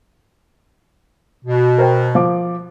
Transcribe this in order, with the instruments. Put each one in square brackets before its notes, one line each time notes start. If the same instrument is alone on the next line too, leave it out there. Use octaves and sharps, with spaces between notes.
[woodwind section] B2
[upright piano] A#4 C5 G5
F3 D6